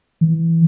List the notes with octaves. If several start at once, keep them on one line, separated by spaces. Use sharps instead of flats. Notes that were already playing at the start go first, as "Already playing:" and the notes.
E3